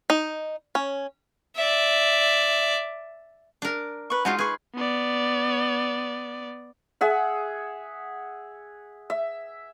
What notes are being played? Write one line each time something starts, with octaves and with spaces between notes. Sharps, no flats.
D#4
C#4
D5 E5
D4 A#4
B4 C#6
G#3 D#4 F4 F#4 C#5 A5
G#4 B4 C#6
B3 D5
G#4 E5 F#5
E5